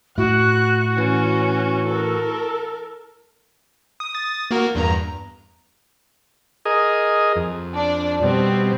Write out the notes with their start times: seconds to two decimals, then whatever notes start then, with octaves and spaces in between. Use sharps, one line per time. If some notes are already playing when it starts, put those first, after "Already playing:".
0.18 A2 E4 F#4 F#6
0.98 E3 C#4
1.88 A4 A#4
4.00 D#6
4.15 D#6 A6
4.51 A#3 F#4 A#4
4.75 E2 G2 A#5
6.65 G#4 A#4 D#5
7.36 F2
7.75 D4 D5
8.23 B2 G3 C4